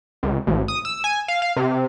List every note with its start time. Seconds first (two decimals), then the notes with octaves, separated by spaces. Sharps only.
0.23 C#2
0.47 A1
0.68 D#6
0.85 E6
1.04 G#5
1.28 F5
1.42 F5
1.56 C3